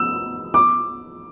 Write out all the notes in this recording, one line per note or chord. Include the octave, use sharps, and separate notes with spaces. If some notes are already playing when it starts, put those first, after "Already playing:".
Already playing: E6
D6